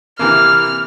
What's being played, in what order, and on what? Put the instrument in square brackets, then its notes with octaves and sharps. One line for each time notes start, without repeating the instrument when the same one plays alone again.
[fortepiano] C3 E3 A#3 [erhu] F6